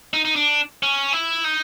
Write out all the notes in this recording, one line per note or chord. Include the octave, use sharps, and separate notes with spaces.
D#4
D#4
D4
C#4
E4
D#4